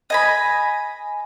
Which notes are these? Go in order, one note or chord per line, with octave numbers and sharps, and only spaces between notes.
D#5 G#5 B5